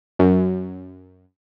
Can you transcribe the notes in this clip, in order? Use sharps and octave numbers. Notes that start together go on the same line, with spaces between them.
F#2